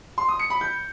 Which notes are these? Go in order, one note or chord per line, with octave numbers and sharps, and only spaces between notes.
C6
D#6
C#7
B5
G6